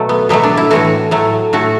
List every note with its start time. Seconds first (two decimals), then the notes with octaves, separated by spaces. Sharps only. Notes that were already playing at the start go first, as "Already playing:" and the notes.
Already playing: B2 F#3 A3
0.09 B3
0.29 B2 F#3 A3 B3
0.43 D4
0.57 E4
0.71 A2 E3 A3 F#4
1.11 A2 F#3 A3
1.53 A2 A3 F#4